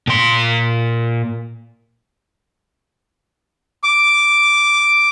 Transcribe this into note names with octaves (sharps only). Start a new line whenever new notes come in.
A#2 C6
D6